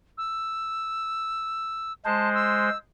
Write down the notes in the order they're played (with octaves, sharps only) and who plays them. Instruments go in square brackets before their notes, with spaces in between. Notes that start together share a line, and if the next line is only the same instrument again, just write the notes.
[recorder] E6
[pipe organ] G#3 C5 [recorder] A5
[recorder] E6